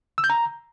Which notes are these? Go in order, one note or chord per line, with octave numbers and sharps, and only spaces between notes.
E6
G6
A#5